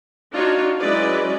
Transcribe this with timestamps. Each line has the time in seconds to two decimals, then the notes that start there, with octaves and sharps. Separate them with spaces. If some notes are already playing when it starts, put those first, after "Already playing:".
0.33 D4 D#4 F4 F#4 C#5
0.80 F#3 G#3 C#4 E4 B4 D5